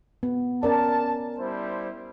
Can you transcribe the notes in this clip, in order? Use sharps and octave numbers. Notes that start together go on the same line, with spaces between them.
B3
C#4 A#4 D5 A5
G3 E4 C5